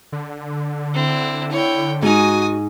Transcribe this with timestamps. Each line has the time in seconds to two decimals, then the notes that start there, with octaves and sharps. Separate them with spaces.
0.12 D3
0.94 C4 E4
1.51 E4 C#5 G5
2.02 G#2 D#4 F#4 G#5 D#6